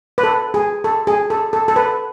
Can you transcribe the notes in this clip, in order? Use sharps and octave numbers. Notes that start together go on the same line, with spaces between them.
B4
A4
G#4
A4
G#4
A4
A4
A4
B4